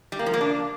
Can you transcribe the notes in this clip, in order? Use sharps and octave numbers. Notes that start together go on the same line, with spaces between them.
G3
A#3
F3
A#3
D4